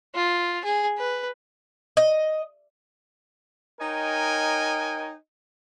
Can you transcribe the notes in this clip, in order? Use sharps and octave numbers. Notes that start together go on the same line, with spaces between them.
F4
G#4
B4
D#5
D#4 A#4 C#5 D#5 G5 G#5